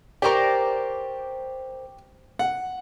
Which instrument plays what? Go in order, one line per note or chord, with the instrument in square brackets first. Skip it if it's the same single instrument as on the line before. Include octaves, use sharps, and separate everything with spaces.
[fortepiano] G4 C#6 [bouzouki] A#4 C5 D5 [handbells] G5
[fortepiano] F#5